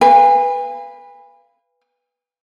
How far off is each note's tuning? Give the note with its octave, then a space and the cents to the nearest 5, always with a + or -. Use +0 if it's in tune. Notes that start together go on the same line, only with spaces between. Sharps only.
B4 +0 F5 -20 G#5 -45